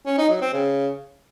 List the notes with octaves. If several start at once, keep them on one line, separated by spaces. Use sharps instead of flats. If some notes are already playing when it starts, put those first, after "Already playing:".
C#4
D#4
F#3
C4
C#3